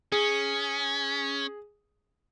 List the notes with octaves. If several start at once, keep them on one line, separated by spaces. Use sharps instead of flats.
C#4 G#4